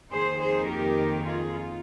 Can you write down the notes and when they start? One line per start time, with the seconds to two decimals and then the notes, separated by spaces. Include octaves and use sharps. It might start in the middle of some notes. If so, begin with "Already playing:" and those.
0.11 F2 D#3 A#3 D#4 G#4 C5
0.40 G#4 C5
0.68 G4 A#4
1.24 F4 G#4
1.52 F4